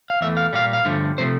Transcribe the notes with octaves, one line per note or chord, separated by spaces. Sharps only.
F5
E2 E3 A3 E5
F5
A#2 G3 A#3 F5
F5
G2 D3 F3 A3
C3 F3 A3 C5